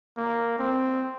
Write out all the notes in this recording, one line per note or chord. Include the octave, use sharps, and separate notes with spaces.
A#3
C4